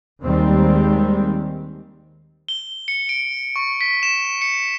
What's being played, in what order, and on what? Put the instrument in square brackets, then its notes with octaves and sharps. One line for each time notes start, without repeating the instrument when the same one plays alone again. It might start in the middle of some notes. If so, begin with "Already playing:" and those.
[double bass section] D#2 D#3 G3 G#3 C4
[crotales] G7
C#7
D7
C#6
B6
E7
C#7